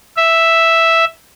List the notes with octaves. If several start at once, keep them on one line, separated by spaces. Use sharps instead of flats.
E5